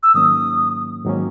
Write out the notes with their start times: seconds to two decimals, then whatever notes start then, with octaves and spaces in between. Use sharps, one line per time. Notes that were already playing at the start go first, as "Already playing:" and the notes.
0.03 E6
0.14 G#2 D#3 F#3 A#3 C#4 D#6
1.05 G#2 D#3 F#3 A#3 C#4